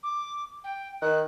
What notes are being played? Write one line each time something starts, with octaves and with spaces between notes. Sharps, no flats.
D6
G5
D#3 F#6